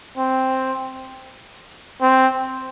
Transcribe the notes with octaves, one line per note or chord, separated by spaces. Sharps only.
C4
C4